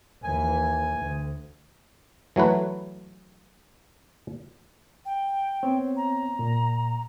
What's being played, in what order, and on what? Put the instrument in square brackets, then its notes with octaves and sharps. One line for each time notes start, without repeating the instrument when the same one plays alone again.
[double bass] D#2 E3 [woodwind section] G#5
[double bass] D2
[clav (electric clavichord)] E3 F#3 A3 B4
[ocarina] G5
[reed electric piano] B3 C4 C#5
[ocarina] A#5
[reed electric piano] A#2